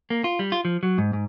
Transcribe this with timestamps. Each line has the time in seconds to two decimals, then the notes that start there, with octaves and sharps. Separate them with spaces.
0.10 A#3
0.24 F4
0.39 G3
0.52 F4
0.65 F3
0.83 F#3
0.98 G#2
1.13 G#2